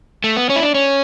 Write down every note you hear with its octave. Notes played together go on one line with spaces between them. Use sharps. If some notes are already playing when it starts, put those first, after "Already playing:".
A3
B3
C#4
E4
D4
C#4